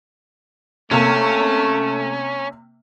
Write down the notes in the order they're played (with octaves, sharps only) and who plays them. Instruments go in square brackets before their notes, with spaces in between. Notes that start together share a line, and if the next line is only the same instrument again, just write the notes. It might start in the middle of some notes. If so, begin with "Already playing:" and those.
[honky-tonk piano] C3 A#3 [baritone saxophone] A3 [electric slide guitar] C#4